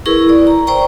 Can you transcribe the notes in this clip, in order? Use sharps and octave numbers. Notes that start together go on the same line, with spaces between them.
E4 G#4 A#4 B4 C#6 E6
D5
A#5
C5 D5 G5 A#5 C#6